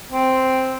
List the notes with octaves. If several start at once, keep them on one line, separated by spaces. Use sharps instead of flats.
C4